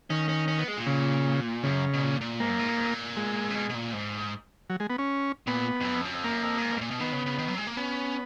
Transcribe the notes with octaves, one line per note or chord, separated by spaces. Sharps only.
D#3 C#4
C#4
C#4
B3
G#3
A#2
C#3
F#2 C#3
B2
A#2
A#2
G#2 A#3
F#2
G#2
A#2
G#2
A#2
G#3
C#3
B2
B2
A#2
G#2
F#3
G#3
B3
C#4
A#2 B3
F2
F#2
F2
F#2
F2
F#2 A#3
F2
A#2
G#2
B2
G#2
A#2
B2
D#3 B3
C#3
C#3
D#3
F#3
G#3
A#3
B3 C#4